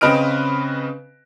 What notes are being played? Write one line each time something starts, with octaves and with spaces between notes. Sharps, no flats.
C#3 C4 B4 D#5 F6 D7